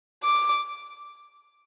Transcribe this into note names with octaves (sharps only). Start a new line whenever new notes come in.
D6